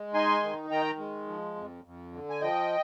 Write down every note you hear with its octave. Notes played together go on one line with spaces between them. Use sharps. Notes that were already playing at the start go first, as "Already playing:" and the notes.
Already playing: G#3
D#4 G#5 C6
D#3
D#3 G5 A#5
G#3
F3
F2
F2
D3
G#5
F3 D#5 G5